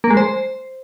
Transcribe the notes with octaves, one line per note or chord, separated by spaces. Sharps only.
A#3
G#3
C5